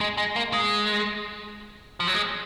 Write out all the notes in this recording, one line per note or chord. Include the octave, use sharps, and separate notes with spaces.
G#3
G#3
A#3
G#3
F3
F#3
G#3